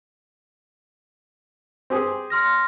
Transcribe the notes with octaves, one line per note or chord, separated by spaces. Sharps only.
C4 G4 G#4
C6 F6 A#6